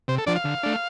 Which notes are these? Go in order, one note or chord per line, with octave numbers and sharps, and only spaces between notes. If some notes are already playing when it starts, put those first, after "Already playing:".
C3 C5
A4
F3 D4 D5
F5
D3
A3 D4